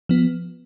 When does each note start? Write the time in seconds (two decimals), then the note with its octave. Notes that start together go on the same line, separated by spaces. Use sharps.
0.09 F3 B3